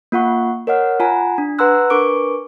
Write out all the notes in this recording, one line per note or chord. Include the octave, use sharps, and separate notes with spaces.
A#3 F4 F#5 C#6
A#4 C#5 D#5 F#5 F6
F4 F#5 G#5 A#5
D4
B4 F#5 A#5 C6 E6 F#6
D4 A#4 B4 C#6 D6 D7